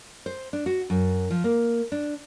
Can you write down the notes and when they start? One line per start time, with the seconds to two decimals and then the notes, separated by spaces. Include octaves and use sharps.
0.26 C5
0.53 D4
0.66 F#4
0.90 F#2
1.31 F3
1.44 A#3
1.92 D4